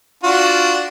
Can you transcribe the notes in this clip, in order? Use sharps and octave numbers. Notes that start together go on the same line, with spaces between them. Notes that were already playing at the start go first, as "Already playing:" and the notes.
D4 F4 F#4